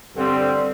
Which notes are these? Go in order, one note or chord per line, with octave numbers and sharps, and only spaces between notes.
G2 D3 G3 C4